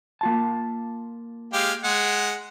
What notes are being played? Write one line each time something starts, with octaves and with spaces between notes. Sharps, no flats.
A#3 F4 A5
G#3 G4 F5
G#3 F#5